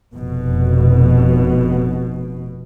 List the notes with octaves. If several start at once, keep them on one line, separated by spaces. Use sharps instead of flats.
F1 B2